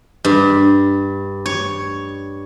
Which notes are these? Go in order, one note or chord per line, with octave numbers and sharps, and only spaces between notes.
G2
C#5